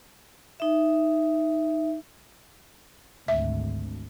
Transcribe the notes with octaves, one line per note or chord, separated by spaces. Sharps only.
D#4 E5
G#1 D2 E5